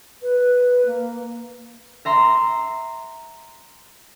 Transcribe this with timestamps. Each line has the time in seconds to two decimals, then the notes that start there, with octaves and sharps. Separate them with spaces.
0.22 B4
0.86 A#3
2.05 E5 A#5 C6